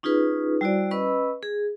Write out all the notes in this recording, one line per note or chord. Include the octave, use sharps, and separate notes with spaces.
C#4 D#4 F4 G#4 B4
G3 E4 F#4 C5 D5
C#4 B4 D#5 B5 E6
G#4